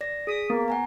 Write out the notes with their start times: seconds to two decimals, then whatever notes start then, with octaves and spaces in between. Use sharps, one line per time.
0.01 D5 A#6
0.27 G#4 D#6 B6
0.50 A#3 B3
0.68 F#5 G#5 A#5